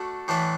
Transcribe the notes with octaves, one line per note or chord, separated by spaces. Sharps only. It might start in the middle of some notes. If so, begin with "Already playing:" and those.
Already playing: A3 D4 F#4 A4
A2 E3 D4 B4